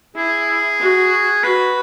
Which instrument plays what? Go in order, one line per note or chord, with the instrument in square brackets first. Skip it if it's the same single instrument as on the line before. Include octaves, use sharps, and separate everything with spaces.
[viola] E4 [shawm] G#4
[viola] F#4
[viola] F#4 [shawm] B4